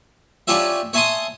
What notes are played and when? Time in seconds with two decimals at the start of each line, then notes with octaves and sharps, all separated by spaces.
0.47 C#4 D4 F4 G4 C#5 E5
0.93 C#5 E5 G#5 A5 C6 D#6